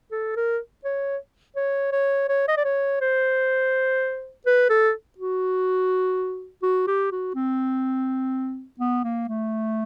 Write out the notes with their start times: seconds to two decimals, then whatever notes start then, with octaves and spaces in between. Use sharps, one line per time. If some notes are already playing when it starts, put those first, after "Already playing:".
0.11 A4
0.36 A#4
0.84 C#5
1.56 C#5
1.92 C#5
2.29 C#5
2.48 D#5
2.57 D5
2.64 C#5
3.01 C5
4.46 B4
4.69 A4
5.18 F#4
6.62 F#4
6.87 G4
7.11 F#4
7.35 C4
8.79 B3
9.04 A#3
9.28 A3